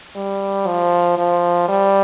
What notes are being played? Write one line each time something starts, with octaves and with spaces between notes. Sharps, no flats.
G3
F3
F3
G3